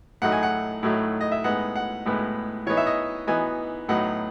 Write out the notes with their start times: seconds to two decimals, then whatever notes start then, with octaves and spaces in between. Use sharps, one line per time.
0.22 A2 F#3 A3 D#4 F#5
0.32 G#5
0.43 F#5
0.83 A2 F#3 A3 D#4
1.21 D#5
1.32 E5
1.44 A2 G#3 B3 D#4 F#5
1.76 F#5
2.06 A2 G#3 B3 D#4
2.66 E3 B3 D#4 C#5
2.77 E5
2.87 D#5
3.27 E3 B3 D#4 G#5
3.89 A2 F#3 B3 D#4 F#5